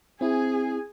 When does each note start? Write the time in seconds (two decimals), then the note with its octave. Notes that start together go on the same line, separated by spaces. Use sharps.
0.21 C4 E4 G#4 G#5